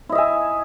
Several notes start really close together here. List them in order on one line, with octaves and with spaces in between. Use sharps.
E4 D#5 E5 G#5